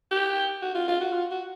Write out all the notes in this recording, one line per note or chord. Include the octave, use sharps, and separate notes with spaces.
G4
F#4
F4
F4
F#4
F4
F#4